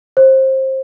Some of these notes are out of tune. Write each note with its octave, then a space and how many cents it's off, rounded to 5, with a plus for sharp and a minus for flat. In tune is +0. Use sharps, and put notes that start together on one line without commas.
C5 +25